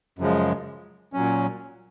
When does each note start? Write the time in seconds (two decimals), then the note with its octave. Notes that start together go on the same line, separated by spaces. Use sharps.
0.19 F#2 C#3 F3 G#3
1.13 A#2 F#3 C#4